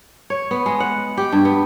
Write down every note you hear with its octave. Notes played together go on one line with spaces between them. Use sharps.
C#5
B3
G#3
F#5
G4
G2
B3